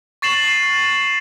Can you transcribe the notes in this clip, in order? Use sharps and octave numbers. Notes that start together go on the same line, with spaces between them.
C#6 A6 C7 E7 F#7